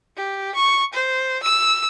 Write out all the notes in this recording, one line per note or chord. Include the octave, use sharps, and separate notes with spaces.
G4
C#6
C5
E6